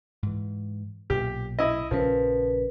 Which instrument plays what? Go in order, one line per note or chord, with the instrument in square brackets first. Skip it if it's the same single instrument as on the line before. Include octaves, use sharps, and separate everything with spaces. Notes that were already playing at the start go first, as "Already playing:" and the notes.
[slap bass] G#2 E3
[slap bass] B1 A#2 [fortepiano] G4
[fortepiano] E4 D#5
[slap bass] A#1 C#3 C#4 [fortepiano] F3 [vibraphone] A#4 B4